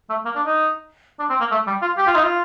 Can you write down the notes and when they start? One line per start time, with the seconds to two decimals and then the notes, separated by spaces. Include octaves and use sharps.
0.10 A3
0.25 A#3
0.36 D4
0.46 D#4
1.19 D4
1.30 C4
1.40 A#3
1.51 A3
1.67 G3
1.82 F4
1.98 G4
2.07 F4
2.15 D#4
2.24 F4